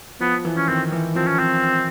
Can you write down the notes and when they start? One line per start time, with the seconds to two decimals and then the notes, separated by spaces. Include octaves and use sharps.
0.20 F3 B3
0.45 E3
0.57 C#4
0.68 D#3 C4
0.92 E3
1.15 F3 C4
1.27 C#4
1.39 C4